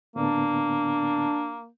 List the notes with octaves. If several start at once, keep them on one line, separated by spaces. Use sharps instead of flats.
A2 D3 A#3 B3 D4